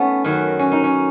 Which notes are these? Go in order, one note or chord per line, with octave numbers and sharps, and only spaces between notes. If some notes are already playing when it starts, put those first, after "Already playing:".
Already playing: A3 B3 C#4 D#4
F#2 D#3 F#3
C#4
D#4
C#4